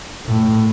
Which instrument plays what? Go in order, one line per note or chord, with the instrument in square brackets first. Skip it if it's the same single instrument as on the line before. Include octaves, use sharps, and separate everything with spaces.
[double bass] A2